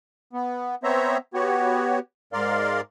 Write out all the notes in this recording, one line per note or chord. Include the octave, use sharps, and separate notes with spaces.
B3
B3 C4 C5 C#5 E5 A#5
B3 F#4 G4 C#5
G#2 A#4 D5 F5 C6